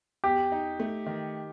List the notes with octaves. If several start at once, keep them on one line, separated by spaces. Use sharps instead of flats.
E2 G4
D#4
A3
D#3